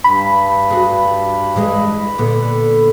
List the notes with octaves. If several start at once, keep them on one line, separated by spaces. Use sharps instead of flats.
G2 B5
F#4 G#4
E3 G#3 G#4
A#2 D3 B3